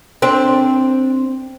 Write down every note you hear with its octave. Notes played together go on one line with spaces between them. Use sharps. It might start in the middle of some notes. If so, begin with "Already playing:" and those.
C4 D4